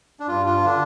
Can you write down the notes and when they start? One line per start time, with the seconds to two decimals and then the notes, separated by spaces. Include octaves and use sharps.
0.20 D4
0.28 G2 F4
0.46 F4
0.65 D3 D4